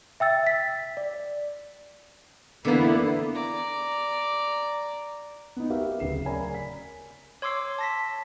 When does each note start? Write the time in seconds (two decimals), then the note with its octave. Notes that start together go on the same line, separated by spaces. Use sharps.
0.20 E5 G5 E6 A6
0.47 B6
0.97 D5
2.65 D3 E3 A#3 B3 E4
3.35 D5 A#5
5.57 B3 D#4
5.70 F#4 G4 A#4 B4 E5 F5
6.00 D1 C#3 C7 E7
6.25 A#4 C#5 D5 G#5 A#5 B5
6.54 B6
7.42 C#5 C6 D6 E6 C7
7.78 A5 A#6 B6